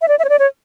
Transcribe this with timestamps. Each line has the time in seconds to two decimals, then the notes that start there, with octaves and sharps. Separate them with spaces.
0.02 E5
0.08 D5
0.19 E5
0.25 C#5
0.29 D5
0.39 C#5